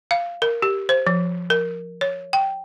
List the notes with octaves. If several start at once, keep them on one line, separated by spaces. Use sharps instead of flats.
F5
A#4
G4
C5
F3
A#4
C#5
G5